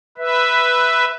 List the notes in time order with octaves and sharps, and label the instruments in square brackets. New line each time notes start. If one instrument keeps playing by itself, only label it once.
[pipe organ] B4 E5